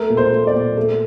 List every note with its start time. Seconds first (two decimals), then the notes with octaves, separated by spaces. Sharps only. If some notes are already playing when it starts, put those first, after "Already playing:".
Already playing: A3 A#4
0.10 A#2
0.17 C5
0.32 A3
0.47 D5
0.55 A#2
0.77 A3